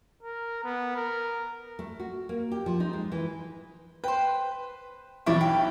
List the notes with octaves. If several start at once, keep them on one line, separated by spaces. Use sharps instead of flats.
A#4
B3
A#4
A3
F#4
A#3
G4
F3
D#4
G#3
E3
B4 C5 G5
B1 E3 E4 C#5 D5 B5
G5